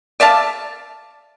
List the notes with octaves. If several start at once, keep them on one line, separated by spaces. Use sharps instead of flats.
D5 E5 F5 A5